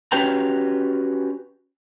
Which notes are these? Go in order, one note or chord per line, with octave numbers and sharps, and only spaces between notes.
C#4 F#4 G4 B4 G5 A#5